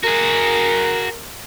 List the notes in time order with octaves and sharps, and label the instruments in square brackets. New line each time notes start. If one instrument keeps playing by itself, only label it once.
[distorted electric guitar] F#4 G#4 [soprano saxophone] A#4